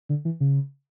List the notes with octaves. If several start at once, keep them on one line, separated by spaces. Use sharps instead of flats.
D3
E3
C#3